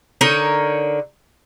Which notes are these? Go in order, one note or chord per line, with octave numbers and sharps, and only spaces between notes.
D3 D#4 A#4 C#5